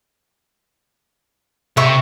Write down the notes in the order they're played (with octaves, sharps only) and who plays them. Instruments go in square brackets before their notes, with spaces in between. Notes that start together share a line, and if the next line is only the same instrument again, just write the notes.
[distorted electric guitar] C3 [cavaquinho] E5 B5 C#6